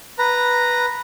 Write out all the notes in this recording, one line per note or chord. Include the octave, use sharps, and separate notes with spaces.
B4 A#5